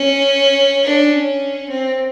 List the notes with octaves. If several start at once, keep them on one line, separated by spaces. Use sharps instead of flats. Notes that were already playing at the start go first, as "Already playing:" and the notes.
Already playing: C#4
D4
C#4
C4